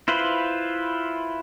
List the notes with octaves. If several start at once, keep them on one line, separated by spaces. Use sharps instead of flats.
E4 F4 B4 C5